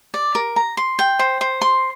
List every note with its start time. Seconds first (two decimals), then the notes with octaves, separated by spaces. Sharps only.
0.14 D5
0.35 A#4
0.56 A#5
0.77 C6
0.99 G5
1.19 C5
1.41 C5
1.61 C6